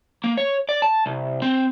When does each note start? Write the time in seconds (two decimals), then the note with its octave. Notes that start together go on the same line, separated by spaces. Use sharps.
0.24 A#3
0.37 C#5
0.69 D5
0.82 A5
1.06 C2
1.42 C4